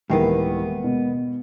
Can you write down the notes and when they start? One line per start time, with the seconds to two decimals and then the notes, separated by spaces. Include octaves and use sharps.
0.10 D#1 G#2 D#3 E3 A#3 B3
0.84 B2